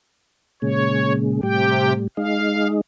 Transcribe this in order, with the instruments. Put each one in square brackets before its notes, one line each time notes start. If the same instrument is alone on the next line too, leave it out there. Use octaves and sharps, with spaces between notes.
[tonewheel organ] A#2 C#3 G#3 [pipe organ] C#5
[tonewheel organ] A2 G3 [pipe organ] C3 G4 G5
[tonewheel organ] G#3 D#4 [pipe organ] F5